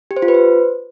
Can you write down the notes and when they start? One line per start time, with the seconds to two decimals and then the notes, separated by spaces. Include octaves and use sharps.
0.11 G4
0.16 C5
0.22 F4
0.28 B4
0.34 C5